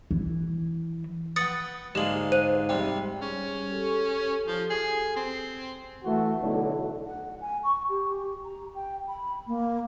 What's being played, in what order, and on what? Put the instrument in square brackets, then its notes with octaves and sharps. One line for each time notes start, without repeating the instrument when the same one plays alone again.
[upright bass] E3
[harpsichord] B4 F#5 G5 [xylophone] D#6 A6 C#7
[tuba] G#2 [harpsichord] D3 G#3 A#3 [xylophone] G4 F#7
[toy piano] C5 [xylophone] D#7
[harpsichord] C3 G3 C4 [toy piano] G5
[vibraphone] G3 G#4 [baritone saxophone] C#4
[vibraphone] G4 A4
[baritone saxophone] F3
G#4
C4
[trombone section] E3 A3 F#4
B1 A2 D3 F#3
[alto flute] F#5
G#5
C#6
G4
A#5
G5
B5
A#3